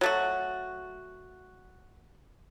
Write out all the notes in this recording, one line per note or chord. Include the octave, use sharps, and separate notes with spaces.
F#3 A3 F#4